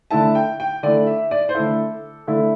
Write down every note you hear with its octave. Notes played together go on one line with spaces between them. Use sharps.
D3 A3 E4 A5
G5
G5
D3 A3 E4 D5
E5
D5
C5
D3 A3 E4 A4
D3 A3 E4